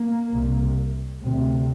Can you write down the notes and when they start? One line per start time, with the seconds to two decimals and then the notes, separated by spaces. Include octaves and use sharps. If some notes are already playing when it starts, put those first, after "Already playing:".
Already playing: A#3
0.31 C2 C3
1.26 D2 C3